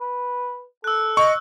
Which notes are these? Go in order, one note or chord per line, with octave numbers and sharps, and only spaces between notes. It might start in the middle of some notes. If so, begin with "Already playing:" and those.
B4
A4 E6 F#6
D#5 C#6